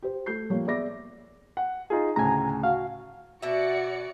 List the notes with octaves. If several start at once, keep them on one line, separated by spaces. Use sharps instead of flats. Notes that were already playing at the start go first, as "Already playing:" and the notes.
G4 C5
A3 G6 C7
F3 G3 A#3 C#5
B3 G#4 D5 E5 D6 A#6
F#5
D#4 F4 G#4
D2 A2 C#3 G#5 A#5
F#4 F5
B2 F#4 D5 E5 C#7